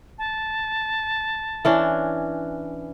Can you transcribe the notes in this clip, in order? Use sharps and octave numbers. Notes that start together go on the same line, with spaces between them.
A5
E3 C#4 D4